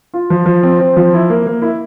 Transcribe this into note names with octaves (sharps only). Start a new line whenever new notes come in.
F4
F3
F3
C4
C4
F3
E4
A#3
A#3
E4